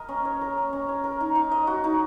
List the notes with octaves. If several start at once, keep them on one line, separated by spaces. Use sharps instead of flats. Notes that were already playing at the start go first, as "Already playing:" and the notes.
Already playing: A#4 D#5
C#4
C#5
A#4
C#4
C#4
C#5
A#4
D#4
D#4
D#5
F#4
D#4